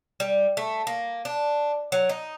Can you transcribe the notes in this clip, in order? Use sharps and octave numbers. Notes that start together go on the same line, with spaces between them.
G3
A3
A#3
D4
F#3
D#4